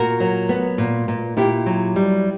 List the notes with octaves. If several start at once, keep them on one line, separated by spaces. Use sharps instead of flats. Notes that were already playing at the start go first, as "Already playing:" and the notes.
Already playing: A#2 F#4 A#4
F#3
B3
A#2
A#2
A#2 E4 G4
F#3
G3